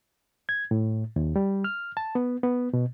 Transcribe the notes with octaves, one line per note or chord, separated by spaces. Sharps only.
G#6
A2
D#2
G3
F6
A5
B3
B3
B2